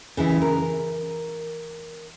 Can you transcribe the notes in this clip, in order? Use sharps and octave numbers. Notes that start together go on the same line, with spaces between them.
C#3 E3 E4
A#4